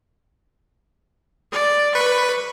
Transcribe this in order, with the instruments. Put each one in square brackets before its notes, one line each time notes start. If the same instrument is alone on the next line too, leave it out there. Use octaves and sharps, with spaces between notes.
[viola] D5
[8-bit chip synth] B4 [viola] C#6